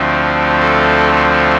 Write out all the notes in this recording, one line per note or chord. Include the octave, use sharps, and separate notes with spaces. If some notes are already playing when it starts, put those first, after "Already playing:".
Already playing: D2 D3 F3 A3 C4
A4